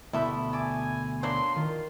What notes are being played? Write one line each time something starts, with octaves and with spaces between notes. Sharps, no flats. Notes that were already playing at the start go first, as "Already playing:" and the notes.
D2 B2 G3 E4 A4
E5 G#5 A5 D6
F#3 A#3 D4 C5 C6
D#3 F4